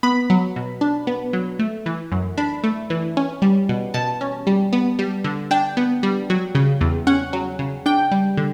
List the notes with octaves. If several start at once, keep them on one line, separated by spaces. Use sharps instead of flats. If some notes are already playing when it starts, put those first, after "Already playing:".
B3 B5
F#3
B2
D4
B3
F#3
A3
E3
F#2
D4 B5
A3
E3
C#4
G3
B2
B2 A5
C#4
G3
B3
G3
D3
D4 G5
B3
G3
F#3
C#3
E2
C#4 F#5
F#3
C#3
D4 G5
G3
D3